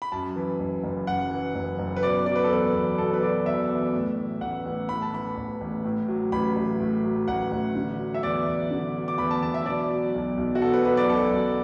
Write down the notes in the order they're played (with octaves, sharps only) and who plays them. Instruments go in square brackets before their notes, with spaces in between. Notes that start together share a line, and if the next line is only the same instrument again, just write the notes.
[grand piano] B5
F#2 A5
E3
F#1
F#1
F#2 F#5
E3
F#1
F#1
B4
B2 D5
F#3 D5
B4
A4
E2 B4
E2
B2 A4
B4
F#3 D5
E2 E5
E2
A2
E3
A1 F#5
A1
A2 B5
A5
E3 B5
A1
A1
A2
F#3
A1 B5
A1
A2
F#3
A1 F#5
A1
D3
F#3
E5
E2 D5
E2
D3
F#3
D6
E2 B5
A5
E2 A5
E5
B2 D5
F#3
B1
B1
F#4
B2 A4
B4
F#3 B4
D5
B1 A4
B1